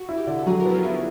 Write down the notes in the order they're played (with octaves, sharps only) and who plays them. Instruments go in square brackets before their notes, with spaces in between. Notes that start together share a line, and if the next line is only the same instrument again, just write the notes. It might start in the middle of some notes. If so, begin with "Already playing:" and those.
Already playing: [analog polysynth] F#4
[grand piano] E4
[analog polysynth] G4
[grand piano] D3
[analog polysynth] A4
[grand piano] F#3 [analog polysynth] G#4
[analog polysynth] A#4
[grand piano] B3 [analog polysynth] E4
[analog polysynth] F4
[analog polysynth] C#4 D4 [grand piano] E4